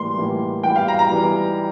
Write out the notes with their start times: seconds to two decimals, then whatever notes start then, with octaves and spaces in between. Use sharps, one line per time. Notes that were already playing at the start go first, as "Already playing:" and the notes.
Already playing: A2 E3 G3 A#3 C6
0.17 A2 E3 G3 A#3
0.63 E3 G3 B3 G5
0.76 F5
0.88 A#5
0.99 A#5
1.11 E3 G3 B3